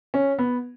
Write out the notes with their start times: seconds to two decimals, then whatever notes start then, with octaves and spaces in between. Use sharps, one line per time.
0.14 C#4
0.39 B3